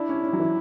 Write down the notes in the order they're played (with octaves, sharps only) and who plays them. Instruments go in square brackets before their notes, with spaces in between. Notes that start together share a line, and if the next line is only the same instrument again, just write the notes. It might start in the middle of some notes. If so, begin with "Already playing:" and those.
Already playing: [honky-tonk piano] D4 [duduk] E4
[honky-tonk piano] C#4
C#4
F#3
E3